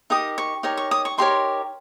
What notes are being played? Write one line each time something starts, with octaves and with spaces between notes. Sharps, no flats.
D#4 G4 A#4 D#6
C#6
D#4 G4 A#4 C#5
C#6
D#6
C#6
D#4 G4 A#4 C#5 C6